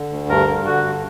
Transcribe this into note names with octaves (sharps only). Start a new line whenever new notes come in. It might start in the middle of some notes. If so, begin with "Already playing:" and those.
Already playing: D3
D2
G2 A#4
D3
D3 F#4
G2